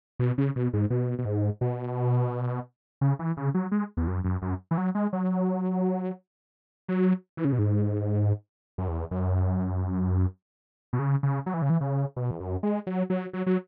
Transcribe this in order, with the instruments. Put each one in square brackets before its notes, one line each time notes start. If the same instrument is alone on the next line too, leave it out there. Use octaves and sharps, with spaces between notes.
[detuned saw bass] B2
C#3
B2
G#2
B2
B2
G#2
B2
C#3
E3
C#3
F#3
G#3
E2
F#2
F#2
F#2
E3
F#3
G#3
F#3
F#3
E3
C#3
B2
G#2
F#2
E2
F#2
B2
C#3
C#3
F#3
E3
C#3
E3
C#3
B2
E2
F#2
G#3
F#3
F#3
F#3
F#3